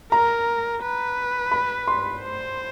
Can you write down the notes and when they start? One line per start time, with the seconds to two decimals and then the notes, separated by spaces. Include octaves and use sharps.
0.12 A#4 A#5
0.82 B4
1.51 B5
1.87 C6
2.21 C5